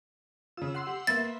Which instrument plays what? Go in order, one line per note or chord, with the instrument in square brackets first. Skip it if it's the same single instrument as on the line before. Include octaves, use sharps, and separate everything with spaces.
[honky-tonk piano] C#3 F4 [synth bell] E6
[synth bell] F#5 C6 E6
[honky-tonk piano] G4
[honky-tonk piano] A#3 C6 C7 [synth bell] B3 E5 [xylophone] A6